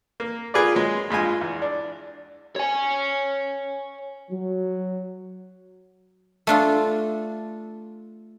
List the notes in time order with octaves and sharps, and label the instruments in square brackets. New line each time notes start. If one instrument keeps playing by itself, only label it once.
[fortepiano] A#3
F4 G#4 A#4 B4 D5
F#3 G#3
G2 G#3 F4 G#5
E2
D4
[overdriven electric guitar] C#5 G#5
[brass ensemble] F#3
[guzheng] A3 D4 F4